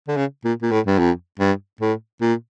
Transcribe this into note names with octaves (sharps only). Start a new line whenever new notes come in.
D3
C#3
A#2
A#2
A2
G2
F2
G2
A2
A#2